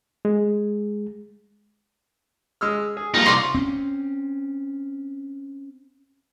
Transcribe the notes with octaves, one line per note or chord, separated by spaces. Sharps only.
G#3
G#3 E6 F6
G#4
F3 G3 A#3 D#4 F4
C2 D5 C6 C#6
C4 C#4